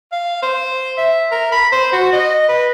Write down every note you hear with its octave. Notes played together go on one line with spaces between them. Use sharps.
F5
C5
E5
A#4
B5
C5
F#4
D#5
B4